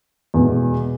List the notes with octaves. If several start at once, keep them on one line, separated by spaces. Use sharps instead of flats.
E2 B2 G#3